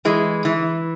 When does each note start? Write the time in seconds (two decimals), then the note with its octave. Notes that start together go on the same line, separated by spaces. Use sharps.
0.05 E3 G#3
0.45 E3